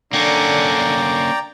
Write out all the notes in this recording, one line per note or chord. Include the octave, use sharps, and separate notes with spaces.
D3 A#3 C#4 D5 G5 A#5